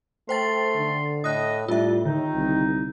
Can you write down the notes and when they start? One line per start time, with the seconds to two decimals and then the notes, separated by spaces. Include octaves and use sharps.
0.29 A3 C5 G5 C6 A6
0.76 D3
1.24 A2 D#5 D#6 F#6
1.68 A2 G3 D4 F4 E5
2.05 D3 D#3 D#4
2.35 C2